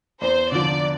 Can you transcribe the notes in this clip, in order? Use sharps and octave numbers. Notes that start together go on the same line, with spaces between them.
E2 C5
D3 F3 D5